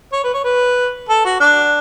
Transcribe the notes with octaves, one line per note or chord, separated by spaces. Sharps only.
C#5
B4
C#5
B4
A4
F#4
D4